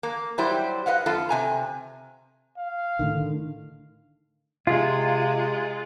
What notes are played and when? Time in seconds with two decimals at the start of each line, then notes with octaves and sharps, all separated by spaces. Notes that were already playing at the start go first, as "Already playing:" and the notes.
0.03 A#3
0.38 F#3 G3 E4 G4 C5
0.86 B4 D#5 F5 F#5
1.06 F#2 B3 F4 A4
1.29 C3 G#5 A#5
2.57 F5
2.99 A2 D3 D#3
4.67 C3 G#3 F4